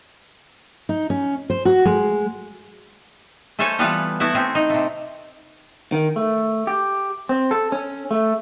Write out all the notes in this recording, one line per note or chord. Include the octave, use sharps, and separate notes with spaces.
D#4
C#4
C5
F#4
G#3
A3 C#4 A4 C5 C#5 G#5
E3 G3 B3 F4 A4 B4
A3 B3 E4 F#4
A3 C4 C#4
D#4
C3 A3
D#3
A3
G4
C4
A4
C#4
A3